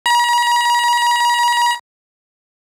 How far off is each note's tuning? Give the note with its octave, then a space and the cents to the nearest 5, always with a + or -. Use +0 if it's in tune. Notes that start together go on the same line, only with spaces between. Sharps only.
A#5 +45